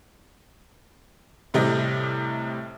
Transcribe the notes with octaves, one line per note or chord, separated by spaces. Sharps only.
A2 C3 G3 G4 D#5